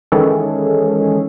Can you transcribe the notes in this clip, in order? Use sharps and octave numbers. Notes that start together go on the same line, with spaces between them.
D#3 E3 G#3 C#4 G#4 A4